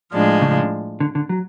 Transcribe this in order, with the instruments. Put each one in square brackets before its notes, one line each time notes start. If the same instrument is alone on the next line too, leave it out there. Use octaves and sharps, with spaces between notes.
[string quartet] A2 F3 G#3 D4
[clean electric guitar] C#3
D3
D3
F#3